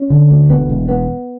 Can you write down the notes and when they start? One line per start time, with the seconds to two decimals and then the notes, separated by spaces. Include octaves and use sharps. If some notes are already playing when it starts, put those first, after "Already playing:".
Already playing: C#4
0.10 D3
0.30 D2
0.49 E1 B3
0.69 E1
0.89 B3